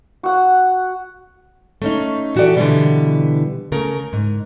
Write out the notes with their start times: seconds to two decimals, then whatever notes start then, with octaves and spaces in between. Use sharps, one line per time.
0.23 F#4 F#5
1.82 A3 C#4 D#4
2.36 E3 F#4 G4 A4 D5
2.57 B2 D3 E3 F#3 G3 B3
3.72 C#3 A3 A#4
4.13 G#2